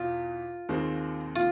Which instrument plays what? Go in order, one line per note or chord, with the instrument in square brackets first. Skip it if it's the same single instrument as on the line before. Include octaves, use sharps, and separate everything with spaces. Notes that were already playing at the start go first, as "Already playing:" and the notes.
Already playing: [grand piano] E2 B2 [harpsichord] F4
[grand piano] D#2 D#3 G#3 C4
[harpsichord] F4